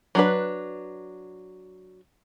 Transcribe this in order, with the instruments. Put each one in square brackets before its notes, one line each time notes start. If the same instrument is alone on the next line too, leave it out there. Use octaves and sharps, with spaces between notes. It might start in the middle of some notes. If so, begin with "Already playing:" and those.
[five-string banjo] F#3 D4 B4